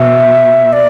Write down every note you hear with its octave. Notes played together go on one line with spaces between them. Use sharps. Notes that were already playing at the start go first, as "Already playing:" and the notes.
Already playing: B2 E5
D5